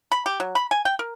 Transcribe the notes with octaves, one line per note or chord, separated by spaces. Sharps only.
B5
G4
F#3
B5
G#5
G5
A#4